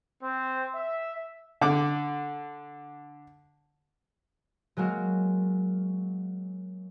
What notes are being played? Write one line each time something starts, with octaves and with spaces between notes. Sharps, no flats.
C4
E5
D3 D6
F#3 G#3 A#3 F#4 A#4